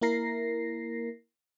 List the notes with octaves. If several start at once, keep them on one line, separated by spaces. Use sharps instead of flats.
A#3 E4 A#4 A#6 C7